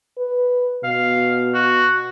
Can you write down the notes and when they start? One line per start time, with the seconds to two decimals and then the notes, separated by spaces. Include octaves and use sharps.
0.18 B4
0.84 B2 F5
1.55 F#4